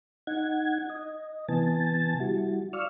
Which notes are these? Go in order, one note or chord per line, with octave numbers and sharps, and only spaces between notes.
D#4 F#5 G#6
D#5
C3 E3 B3 G#5 A5 A6
G3 E4 F#4
D5 F5 C#6 E6 F6